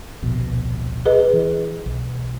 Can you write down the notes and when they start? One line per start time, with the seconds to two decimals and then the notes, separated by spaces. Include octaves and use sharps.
0.22 D1 A#1 B2
1.06 G#4 B4 D#5
1.33 E3
1.86 B1